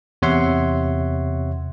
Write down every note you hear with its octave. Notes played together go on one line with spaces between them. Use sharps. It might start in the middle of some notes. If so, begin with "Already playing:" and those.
E2 C3 C#5 E5 F#5 C6